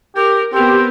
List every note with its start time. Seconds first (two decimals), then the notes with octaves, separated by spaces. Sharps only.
0.15 G4 A#4
0.53 B3 C4 G4 A#4